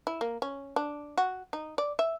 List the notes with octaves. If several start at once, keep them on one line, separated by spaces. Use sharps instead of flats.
E4
A#3
C#4
D4
F#4
D#4
D5
E5